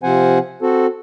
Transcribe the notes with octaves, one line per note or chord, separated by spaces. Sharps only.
C3 F3 C4 C5 F#5 G#5
C4 F#4 A4